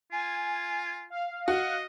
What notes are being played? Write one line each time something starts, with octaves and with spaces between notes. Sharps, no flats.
F4 G#5
F5
F#4 D#5